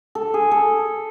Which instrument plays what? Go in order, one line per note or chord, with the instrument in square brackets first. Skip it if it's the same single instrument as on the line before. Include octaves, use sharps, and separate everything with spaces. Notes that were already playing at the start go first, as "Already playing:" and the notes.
[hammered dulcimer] A4
G#4
A4